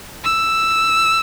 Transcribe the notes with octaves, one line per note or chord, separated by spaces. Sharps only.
E6